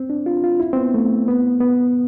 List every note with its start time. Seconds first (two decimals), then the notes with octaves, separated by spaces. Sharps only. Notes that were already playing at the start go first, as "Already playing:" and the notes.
Already playing: C4
0.10 D4
0.26 F4
0.44 F4
0.60 E4
0.73 C4
0.76 B3
0.94 A3
1.28 B3
1.60 B3